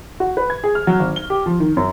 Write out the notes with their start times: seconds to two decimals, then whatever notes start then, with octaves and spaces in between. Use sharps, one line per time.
0.20 F#4
0.37 B4
0.50 G#6
0.64 G#4
0.75 F6
0.87 F#3
0.99 G#1
1.16 G7
1.30 G4
1.46 F3
1.60 D#3
1.77 F#2